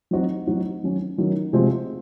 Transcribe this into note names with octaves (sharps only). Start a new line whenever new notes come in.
F#3 C4 D#4 F#4
F#3 C4 D#4 F#4
D#3 F#3 C#4
D#3 F#3 C#4
C3 F3 G#3 C4 F#4